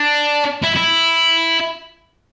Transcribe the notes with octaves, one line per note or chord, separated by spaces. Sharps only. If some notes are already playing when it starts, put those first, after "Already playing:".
Already playing: D4
E4
E4